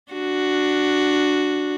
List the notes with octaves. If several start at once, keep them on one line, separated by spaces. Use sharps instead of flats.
D4 F#4